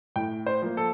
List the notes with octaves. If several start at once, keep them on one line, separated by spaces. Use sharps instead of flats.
A2 G5
C5
F3 A#3
A4